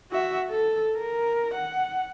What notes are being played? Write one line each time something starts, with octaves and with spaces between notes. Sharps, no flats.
F#4 E5
A4
A#4
F#5